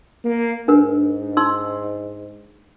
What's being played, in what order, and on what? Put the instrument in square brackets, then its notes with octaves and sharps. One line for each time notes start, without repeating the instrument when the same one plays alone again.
[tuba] A#3
[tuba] G#2 [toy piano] D4 A#4 B4
[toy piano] D#4 C6 E6